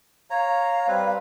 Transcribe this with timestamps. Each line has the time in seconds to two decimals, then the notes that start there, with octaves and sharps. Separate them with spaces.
0.30 C#5 F5 A#5
0.88 G3 C4 B4